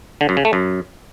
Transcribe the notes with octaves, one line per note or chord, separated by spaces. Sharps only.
D3
F#2
C#3
A3
F#2